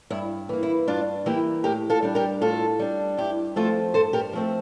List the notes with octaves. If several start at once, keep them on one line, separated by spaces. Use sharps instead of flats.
G2 E4
E3 A#3
E4
G2 D4 F4
E3 A#3 E4 G4
A2 G4 A#4
F4 A4
G3 D4
G4 A#4
A2 F4 A4
G3 D4
G2 E4 G4
F3 A3 C4 F4 A4
G2 A4 C5
G4 A#4
F3 A3 C4